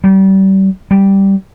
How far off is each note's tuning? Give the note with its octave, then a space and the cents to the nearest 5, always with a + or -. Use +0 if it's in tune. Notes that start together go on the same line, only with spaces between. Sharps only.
G3 -30
G3 -5